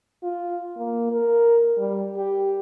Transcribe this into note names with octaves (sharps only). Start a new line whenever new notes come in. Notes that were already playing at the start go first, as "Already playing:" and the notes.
F4
A#3
A#4
G3
G4